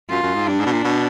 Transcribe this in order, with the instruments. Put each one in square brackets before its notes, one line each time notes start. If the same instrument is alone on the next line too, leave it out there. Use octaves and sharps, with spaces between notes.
[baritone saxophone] F#2 [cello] F4
[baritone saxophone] F#2
G#2
[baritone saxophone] G2 [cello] D4
[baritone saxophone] G#2
B2
A#2
B2